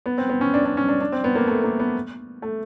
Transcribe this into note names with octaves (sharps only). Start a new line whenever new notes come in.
B3
C4
B3
C#4
D4
D4
C#4
D4
D4
C4
B3
A#3
A3
A#3
B3
A3